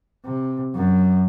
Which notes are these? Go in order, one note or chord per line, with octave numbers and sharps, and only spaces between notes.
C3
F#2